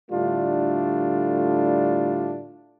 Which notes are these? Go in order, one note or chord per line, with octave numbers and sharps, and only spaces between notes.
A2 D3 G3 A3 D4 F4